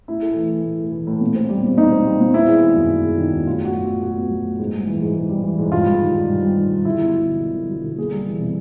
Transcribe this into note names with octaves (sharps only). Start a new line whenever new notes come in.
A2 E4
A3
E3
A2
A2
A3
E3
A2
A#2
C4
G3
A#2
A#2 D#4
C4
G3
A#2
B3 E4
G#3
D#3
F#2
B3
G#3
D#3
F#2
A2 F4
B3 F#4
F#3
F4
A2
A2 F#4
B3
F#3
A2
G#2
G3
E3
G#2
G#2
G3
E3
G#2
G2 F4
G3
D#3
G2
G2
G3
D#3
G2
D3 E4
B3
F#3
D3
D3
B3
F#3
D3
A#3 G#4
G3
E3
C3